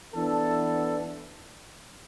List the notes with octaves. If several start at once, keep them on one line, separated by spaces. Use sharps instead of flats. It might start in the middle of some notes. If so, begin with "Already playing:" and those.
E3 B3 D4 A4